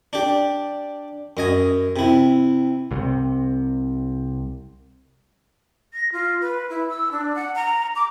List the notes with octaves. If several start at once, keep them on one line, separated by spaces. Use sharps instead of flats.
D4 G4
F#2 D#5 G#5
C3 E4
C2 A2 C3
A#6
F4
B4
E4
E6
D4
F#5
A#5
D6